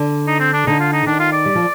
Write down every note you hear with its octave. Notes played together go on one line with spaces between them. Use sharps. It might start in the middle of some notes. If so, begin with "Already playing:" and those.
Already playing: D3
D#4
C4
D4
D3 D#4
F4
D#4
D#3 D4
F4
D5
G3
F3